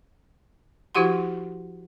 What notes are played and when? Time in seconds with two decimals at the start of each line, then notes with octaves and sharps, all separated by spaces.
0.95 F3 E4 F#4 G4 F#5 C6